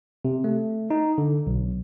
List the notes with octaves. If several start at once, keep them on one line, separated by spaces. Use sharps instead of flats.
C3
A3
D#4
D3
B1